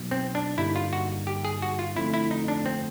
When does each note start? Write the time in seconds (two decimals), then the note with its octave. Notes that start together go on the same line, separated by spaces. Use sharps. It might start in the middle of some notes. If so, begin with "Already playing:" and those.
Already playing: B2 F#3 B3 D#4
0.11 C4
0.35 D4
0.57 G2 D3 G3 A#3 D#4 E4
0.76 F4
0.93 F#4
1.27 G4
1.45 G#4
1.62 F#4
1.79 F4
1.96 D3 F3 A3 C4 E4 F4
2.14 E4
2.31 D#4
2.48 D4
2.66 C4